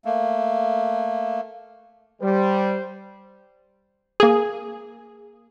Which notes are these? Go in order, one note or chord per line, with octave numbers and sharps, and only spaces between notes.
A3 A#3
G3 C5
A#3 G#4